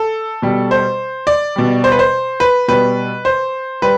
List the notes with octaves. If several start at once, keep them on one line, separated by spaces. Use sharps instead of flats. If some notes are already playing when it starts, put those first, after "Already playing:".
Already playing: A4
B2 G3
C5
D5
B2 G3
C5
B4
C5
B4
B2 G3 B4
C5
G3 B4